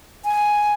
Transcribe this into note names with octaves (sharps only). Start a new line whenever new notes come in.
G#5